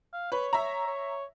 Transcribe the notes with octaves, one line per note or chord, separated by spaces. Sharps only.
F5
B4 C#5
E5 A#5
C#5